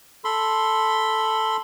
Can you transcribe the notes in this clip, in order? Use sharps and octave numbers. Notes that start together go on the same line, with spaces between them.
A4 B5 C6